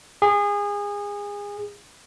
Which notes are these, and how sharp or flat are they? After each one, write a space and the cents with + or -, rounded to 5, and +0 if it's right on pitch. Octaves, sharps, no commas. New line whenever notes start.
G#4 -25